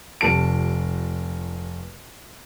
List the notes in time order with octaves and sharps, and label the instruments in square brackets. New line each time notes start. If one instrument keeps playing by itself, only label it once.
[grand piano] F1 A5 D7